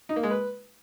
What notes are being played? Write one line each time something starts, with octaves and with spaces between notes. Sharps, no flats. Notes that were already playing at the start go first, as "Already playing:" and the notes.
D#4
A#3
G#3
B4